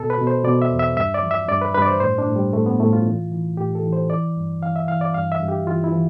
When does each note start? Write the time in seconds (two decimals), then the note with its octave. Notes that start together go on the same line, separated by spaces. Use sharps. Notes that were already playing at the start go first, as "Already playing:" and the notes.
Already playing: B2 A4
0.10 B4
0.18 B2
0.27 C5
0.44 B2 D5
0.62 E5
0.70 E2
0.79 E5
0.97 G2 E5
1.14 D5
1.23 F3
1.31 E5
1.48 G2 D5
1.61 B4
1.74 G2 B4
1.82 D5
1.88 C5
2.00 A2 C5
2.18 D4
2.27 A2
2.36 G3
2.53 A2 A3
2.66 B3
2.80 A2 A3
2.93 F4
3.06 E3
3.31 E3
3.57 A2 G4
3.75 A4
3.83 E3
3.93 C5
4.10 E3 D5
4.36 G2
4.62 E3 F5
4.76 E5
4.88 E3 F5
5.01 D5
5.14 G2 F5
5.32 E5
5.40 G2
5.49 G4
5.66 E3 F4
5.84 E4
5.92 E3